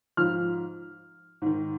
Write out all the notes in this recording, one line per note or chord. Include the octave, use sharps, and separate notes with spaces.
G#2 F3 F6
G#2 D#3